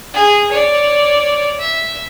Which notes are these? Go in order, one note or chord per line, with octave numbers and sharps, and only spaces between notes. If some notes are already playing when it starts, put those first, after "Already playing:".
G#4
C#5 D5
E5